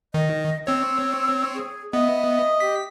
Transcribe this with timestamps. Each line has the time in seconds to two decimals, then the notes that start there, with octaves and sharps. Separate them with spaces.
0.14 D#3 D#5
0.67 C4 C#5 E6
1.55 G#4
1.93 B3 D#5 E5
2.60 G4 B6